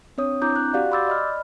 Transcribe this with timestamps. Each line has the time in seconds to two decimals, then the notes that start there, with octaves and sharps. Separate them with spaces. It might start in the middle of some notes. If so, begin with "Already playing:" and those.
0.18 C4 D4 C#5 D#6
0.42 C4 D4 E4 A#5 D6 G6
0.56 F#6
0.73 F#4 G4 D5 F5 F#5
0.92 B5 C6 D6 E6 G6 A6
1.07 D5 D#5 B5 F6